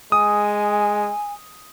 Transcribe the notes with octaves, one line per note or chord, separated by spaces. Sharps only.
G#3 G#5 D#6